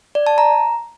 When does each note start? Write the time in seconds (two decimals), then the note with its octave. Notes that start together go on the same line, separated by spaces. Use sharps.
0.15 D5
0.27 A5
0.38 A#5